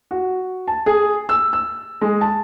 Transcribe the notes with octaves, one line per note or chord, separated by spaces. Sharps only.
F#4
A5
G#4
E6
E6
G#3
A5